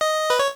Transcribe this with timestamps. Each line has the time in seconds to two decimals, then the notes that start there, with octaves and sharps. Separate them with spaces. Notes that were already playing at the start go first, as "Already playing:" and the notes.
0.01 D#5
0.30 B4
0.39 C#5